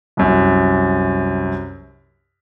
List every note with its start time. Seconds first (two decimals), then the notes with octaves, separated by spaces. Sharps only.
0.17 C2 F#2